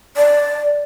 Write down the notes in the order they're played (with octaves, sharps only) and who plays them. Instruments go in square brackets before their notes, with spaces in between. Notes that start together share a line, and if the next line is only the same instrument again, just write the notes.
[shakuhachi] D5